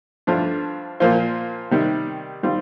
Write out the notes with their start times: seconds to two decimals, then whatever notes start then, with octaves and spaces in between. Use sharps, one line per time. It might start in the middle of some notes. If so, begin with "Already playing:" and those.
0.27 G2 F3 A3 D4
1.00 A#2 F3 A#3 F4 C5
1.71 C3 D#3 G3
2.43 D#3 G3 C4 F4